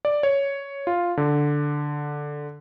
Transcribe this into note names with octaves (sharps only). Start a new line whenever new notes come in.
D5
C#5
F4
D3